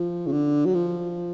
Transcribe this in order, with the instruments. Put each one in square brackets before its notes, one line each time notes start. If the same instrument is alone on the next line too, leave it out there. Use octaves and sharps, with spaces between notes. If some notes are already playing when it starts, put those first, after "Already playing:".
Already playing: [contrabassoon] F3
C#3
D3
F#3
F3